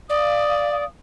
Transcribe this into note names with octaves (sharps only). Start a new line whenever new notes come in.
D5 F5 D#6